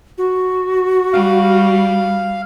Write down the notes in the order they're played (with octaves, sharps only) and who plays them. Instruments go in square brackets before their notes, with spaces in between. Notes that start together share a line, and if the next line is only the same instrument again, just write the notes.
[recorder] F#4
[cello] G3 [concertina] F5